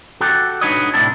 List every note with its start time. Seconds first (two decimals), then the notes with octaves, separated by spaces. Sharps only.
0.21 F#4 G4 A4
0.61 D4 D#4 F#4 B4 C#5 D#5
0.94 A2 C3 D4 E4 A5